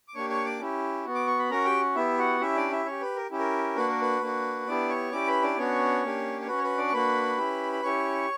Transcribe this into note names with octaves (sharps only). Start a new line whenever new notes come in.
D6
A#3 D4 G4 C#5 C#6
C#5 C#6
D5 D6
C#4 E4 G4
B3 F#4
D6
C#6
B5
C#4 F#4 A#4 A#5
G4 G5
B3 E4 G4 E5
F#4 F#5
C#4 E4 G4 E5
D4 D5
E4 E5
C#4 G4 C#5
B4
A#4
C#4 E4 G4
A#4
A#3 D4 F#4 B4
A#4
B4
A#3 D4 F#4
B3 D4 E4 G4 D5
C#5 C#6
C#4 E4 G4 D5 D6
B4 B5
D4 D5
B3 C#4 D4 F#4 C#5
A#3 D4 G4
C#5
C#4 F#4 B4
C#5
B4
D4 D5
C#6
A#3 D4 F#4 B4 B5
C#4 E4 G4
B5
C#4 E4 G4 C#5 C#6